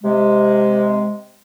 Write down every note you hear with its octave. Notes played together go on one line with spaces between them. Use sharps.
C3 G#3